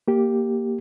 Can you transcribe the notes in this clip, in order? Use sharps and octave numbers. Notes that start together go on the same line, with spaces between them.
A#3 G4